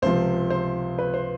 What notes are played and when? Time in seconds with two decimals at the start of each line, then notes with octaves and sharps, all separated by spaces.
0.02 C#2 C3 F3 C5
0.50 C5
0.99 B4
1.14 C5